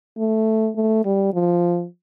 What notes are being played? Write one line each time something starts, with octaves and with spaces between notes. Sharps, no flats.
A3
A3
G3
F3